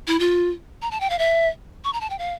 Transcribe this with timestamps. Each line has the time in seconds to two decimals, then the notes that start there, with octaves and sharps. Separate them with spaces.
0.07 E4
0.20 F4
0.82 A#5
0.91 A5
1.01 G5
1.10 F5
1.19 E5
1.84 C#6
1.93 A#5
2.01 A5
2.10 G5
2.19 F5